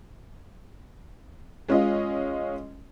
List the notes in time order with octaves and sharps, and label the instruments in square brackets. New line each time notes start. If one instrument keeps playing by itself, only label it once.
[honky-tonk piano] G#3 C#4 F4 D#5